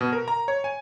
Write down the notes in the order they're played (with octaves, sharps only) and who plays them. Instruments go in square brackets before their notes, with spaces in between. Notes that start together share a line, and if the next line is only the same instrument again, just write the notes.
[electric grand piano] B2
A#4
A#5
C#5
G#5